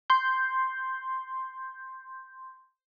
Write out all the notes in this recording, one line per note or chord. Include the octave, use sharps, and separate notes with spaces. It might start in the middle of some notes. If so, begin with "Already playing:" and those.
C6 G6